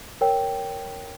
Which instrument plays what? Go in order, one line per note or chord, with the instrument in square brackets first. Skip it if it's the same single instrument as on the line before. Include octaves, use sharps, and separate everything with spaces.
[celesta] A#4 C#5 G5